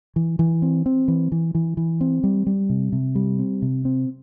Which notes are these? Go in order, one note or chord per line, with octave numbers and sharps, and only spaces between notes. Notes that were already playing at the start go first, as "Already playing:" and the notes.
E3
E3
C4
C4
E3
E3
E3
E3
C4
G3
G3
C3
C3
G3
C4
C3
C4